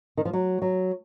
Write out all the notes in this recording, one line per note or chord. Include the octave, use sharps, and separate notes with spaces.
D#3
F3
F#3
F#3